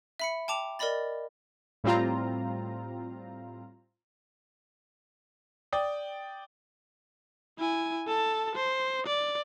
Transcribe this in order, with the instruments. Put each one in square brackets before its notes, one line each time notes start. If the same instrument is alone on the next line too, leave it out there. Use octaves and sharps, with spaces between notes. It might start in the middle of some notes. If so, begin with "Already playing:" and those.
[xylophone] E5 B5 C#7
G5 A5 D6 F7
A#4 D5 D#5 B5 A6
[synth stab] A2 G3 C4 F4 A#5
[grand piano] D5 G5 D#6
[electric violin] E4 G#5
A4 A5
C5
D5